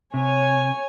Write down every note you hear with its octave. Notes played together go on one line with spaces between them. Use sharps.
C3 C#5 G#5